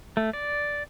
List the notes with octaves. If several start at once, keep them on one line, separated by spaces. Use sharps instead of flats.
A3
D5